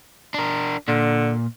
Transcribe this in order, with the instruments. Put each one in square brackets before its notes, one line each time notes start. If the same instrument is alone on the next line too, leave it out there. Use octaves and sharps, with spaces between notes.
[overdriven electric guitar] D4 A#4
[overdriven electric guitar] A#2 [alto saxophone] D3